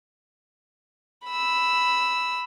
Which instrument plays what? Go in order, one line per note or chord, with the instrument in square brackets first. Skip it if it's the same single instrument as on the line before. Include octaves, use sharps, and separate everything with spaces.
[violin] B5 E6